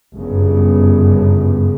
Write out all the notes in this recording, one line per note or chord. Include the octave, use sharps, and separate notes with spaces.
G1 F#2 C#3